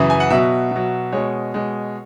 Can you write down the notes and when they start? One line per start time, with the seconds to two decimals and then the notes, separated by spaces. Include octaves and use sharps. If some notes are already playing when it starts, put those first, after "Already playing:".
Already playing: F#2 C#3 E3 E5
0.10 G#5
0.20 F#5
0.30 B2 F#3 E5
0.71 B2 F#3
1.12 B2 G#3 C#5
1.54 B2 G#3